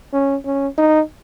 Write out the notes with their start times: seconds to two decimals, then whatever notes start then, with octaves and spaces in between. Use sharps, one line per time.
0.13 C#4
0.45 C#4
0.78 D#4